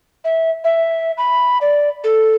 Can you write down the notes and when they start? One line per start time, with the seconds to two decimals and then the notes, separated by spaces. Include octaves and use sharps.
0.25 E5
0.64 E5
1.18 B5
1.61 D5
2.04 A4